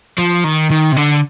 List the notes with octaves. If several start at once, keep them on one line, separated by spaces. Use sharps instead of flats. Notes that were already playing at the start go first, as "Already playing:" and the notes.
F3
D#3
D#3
C3
D3